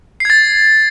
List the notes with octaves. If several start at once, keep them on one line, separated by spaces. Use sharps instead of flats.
G#6 A6 C7